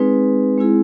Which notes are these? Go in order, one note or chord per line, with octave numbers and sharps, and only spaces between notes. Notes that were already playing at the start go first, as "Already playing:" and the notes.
Already playing: G#3 C4 D#4 G#4 B4
G#3 C4 E4 G#4